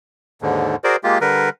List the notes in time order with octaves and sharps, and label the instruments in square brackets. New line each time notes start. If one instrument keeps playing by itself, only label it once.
[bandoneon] D#2 G#2 D3
F#4 G#4 A#4 C5 D5
G#3 A#3 F4 G4
D3 G3 A#4 B4